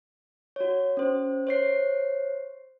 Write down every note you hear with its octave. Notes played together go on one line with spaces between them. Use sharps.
F#4 C#5
C#4 C5
C5 C#5 C7